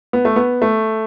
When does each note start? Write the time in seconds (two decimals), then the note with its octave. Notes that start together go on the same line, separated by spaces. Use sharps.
0.13 B3
0.25 A3
0.36 B3
0.62 A3